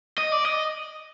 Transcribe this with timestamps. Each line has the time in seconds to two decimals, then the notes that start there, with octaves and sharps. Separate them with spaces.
0.18 D#5
0.32 D5
0.45 D#5